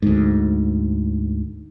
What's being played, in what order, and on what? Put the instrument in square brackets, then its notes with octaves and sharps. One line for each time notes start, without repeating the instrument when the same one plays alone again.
[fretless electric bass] D2 G#2